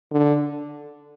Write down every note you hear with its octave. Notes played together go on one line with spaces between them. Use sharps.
D3